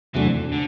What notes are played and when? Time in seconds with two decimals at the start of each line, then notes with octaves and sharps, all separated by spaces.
0.14 E2 C3 E3 F#3 A3 D4
0.52 D3